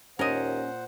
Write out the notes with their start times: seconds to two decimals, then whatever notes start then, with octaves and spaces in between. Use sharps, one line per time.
0.19 D#2 A#2 C#4 A#4 C5 D#5 F#5